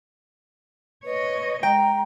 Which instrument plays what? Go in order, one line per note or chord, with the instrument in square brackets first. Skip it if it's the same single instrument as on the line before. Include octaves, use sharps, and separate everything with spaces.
[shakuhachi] B4 [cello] C#5 D#5
[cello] G#3 [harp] G5 [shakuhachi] A#5